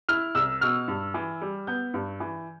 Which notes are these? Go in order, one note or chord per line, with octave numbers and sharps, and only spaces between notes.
E4 F6
C2 E6
B2 F6
G2
E3
G3
B3 G6
G2
E3